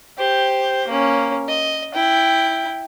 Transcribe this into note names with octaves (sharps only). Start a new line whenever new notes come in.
G4 C5
A#3 C#4
D#5
E4 G5